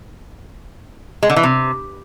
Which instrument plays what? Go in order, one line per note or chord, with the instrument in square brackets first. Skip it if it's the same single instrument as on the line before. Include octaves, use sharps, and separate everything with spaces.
[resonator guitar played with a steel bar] G#3
D3
E3
C3